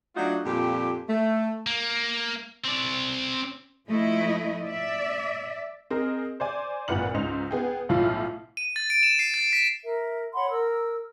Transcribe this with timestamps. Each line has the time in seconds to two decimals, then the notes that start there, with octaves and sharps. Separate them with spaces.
0.16 F#3 A3 D4 D#4 F4 F#4
0.45 F2 A#2 G3 G4
1.09 A3
1.66 A#3
2.65 C4 D5
3.89 F3 A3 E4 D#5
4.65 D5 E5
5.90 C4 G#4 A#4 D#5
6.40 C5 D5 G#5
6.88 G#1 A#2 B4 F#5 F6 F#7
7.14 C#2 G#2 D#4 C5 F7
7.51 B3 G#4 G5
7.89 B1 A2 F3 F4 F5
8.57 D#7
8.76 A6
8.90 D7
9.03 E7
9.19 C7
9.34 A6
9.53 B6
9.84 A#4 E5
10.35 C#5 F#5 B5 C6
10.50 A#4 E6